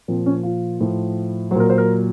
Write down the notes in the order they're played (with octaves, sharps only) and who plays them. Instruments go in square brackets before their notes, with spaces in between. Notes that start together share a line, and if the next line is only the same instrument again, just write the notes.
[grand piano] A#2 F3 C4
C#4
F4
A2 F3
F#3 C5
A#2 A#4
C5
A#4